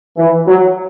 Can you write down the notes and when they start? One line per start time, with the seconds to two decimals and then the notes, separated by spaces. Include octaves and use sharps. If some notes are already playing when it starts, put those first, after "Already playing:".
0.17 E3
0.47 F#3